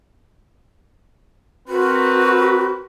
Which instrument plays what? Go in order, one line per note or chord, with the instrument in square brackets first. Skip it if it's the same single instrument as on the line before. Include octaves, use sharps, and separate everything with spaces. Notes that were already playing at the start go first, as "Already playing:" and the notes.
[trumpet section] C4 A#4 B4 [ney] F#4